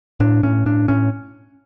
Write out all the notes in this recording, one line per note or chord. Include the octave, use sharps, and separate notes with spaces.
A2 D4
A2 C#4
A2 D4
A2 C#4